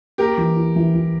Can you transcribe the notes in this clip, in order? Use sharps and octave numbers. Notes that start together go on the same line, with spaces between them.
A#3 G4 A#4
E3
E4
E3
E3